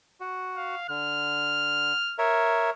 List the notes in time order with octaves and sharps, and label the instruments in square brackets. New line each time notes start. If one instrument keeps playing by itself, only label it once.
[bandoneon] F#4
[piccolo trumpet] F5
[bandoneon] D3 [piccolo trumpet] F6
[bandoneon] A#4 C#5 E5